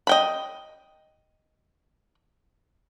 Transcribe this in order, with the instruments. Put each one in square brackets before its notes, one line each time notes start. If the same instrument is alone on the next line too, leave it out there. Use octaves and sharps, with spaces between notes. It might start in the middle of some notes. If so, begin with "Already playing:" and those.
[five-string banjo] D#5 G5 B5